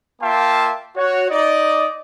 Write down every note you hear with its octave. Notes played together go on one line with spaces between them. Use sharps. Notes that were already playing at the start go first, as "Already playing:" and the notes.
A#3 F4 E5 G5 A5 C6
F#4 C#5
D#4 D5 D#5